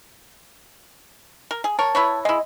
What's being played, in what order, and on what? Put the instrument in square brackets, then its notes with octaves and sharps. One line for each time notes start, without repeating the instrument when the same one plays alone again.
[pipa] A#4
G#4
[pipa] A#4 C#5 [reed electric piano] A5
[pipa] E4 B4 C#5
[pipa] G#3 E4 [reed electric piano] D#5